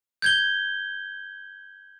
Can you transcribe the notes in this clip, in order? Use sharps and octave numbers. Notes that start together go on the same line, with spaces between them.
G6 G#6 G7